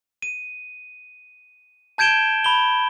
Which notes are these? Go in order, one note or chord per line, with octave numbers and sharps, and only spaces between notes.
D#7
A5 G6 G#6 D7 E7 G7
B5 G7